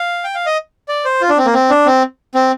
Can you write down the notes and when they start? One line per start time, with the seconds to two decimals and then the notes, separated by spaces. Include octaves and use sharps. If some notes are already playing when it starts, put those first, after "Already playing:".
Already playing: F5
0.24 G5
0.35 F5
0.46 D#5
0.88 D5
1.05 C5
1.21 F4
1.29 D4
1.38 C4
1.46 A#3
1.54 C4
1.70 D4
1.86 C4
2.35 C4